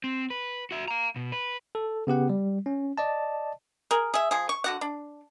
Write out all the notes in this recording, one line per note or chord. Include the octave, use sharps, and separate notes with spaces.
C4
B4
F#4 E5
F5 A#5
B2
B4
A4
C#3 B3 G4 F#5
G3
C#4
D5 D#5 A5
G#4 A#4
G#4 E5
F3 G#4
C#6
D3 F#4 F#5
D4